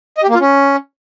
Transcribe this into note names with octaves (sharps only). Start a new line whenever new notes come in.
D#5
G4
A#3
F4
C#4